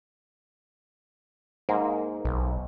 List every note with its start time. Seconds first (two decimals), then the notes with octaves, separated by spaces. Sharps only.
1.69 G#2 A#3
2.25 B1